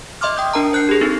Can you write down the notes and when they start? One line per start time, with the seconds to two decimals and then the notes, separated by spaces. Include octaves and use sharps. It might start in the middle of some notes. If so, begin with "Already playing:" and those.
0.21 D#5 E5 C6 D6 F6
0.37 G5 D#6 G6
0.54 D4 A#4 A5 A#5
0.73 C5 F#6 G6 C7
0.89 G4 G#4
1.01 C4 D#4 A4